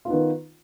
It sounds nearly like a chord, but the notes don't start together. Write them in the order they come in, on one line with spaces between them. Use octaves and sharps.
F4 D#4 B3 D#3